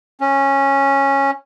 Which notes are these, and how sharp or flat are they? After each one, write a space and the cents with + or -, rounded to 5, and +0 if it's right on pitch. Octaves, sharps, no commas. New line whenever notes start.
C#4 -10